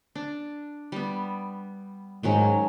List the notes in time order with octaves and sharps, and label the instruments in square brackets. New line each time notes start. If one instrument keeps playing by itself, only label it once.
[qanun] D4
G3 B3
[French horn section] G#2 [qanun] D#3 F#3 C#4